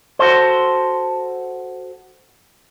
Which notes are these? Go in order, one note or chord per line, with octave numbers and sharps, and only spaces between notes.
F#4 A4 C5